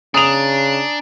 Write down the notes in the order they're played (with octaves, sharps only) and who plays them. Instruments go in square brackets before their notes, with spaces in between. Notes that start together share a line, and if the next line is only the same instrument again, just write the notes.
[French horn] C#3 [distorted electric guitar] D4 [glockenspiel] G#5 A#5 D7 [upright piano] D#6 F7